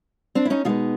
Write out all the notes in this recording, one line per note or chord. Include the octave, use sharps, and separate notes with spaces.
C4 D4
E4
C#4 D#4
B2 G#3 B3 D#4 F4